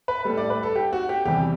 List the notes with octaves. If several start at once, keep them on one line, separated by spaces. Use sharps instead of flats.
B4
A2 G3 A4
D5
B4
A4
G4
F#4
G4
E2 C3 E3 G3 G4